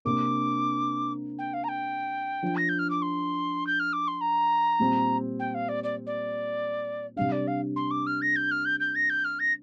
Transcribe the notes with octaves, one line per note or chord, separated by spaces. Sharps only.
C3 A#3 D4 D6
G5
F5
A#5
G5
F3 D4
A#6
G6
F6
D6
C6
G6
F6
D6
C6
A#5
A#2 G3 C4
G5
F5
D5
D5
D5
C3 G3 D4 F5
D5
F5
C6
D6
F6
A#6
G6
F6
G6
G6
A#6
G6
F6
A#6